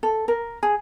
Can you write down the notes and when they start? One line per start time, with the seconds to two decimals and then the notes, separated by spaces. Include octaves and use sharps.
0.03 A4
0.28 A#4
0.63 G#4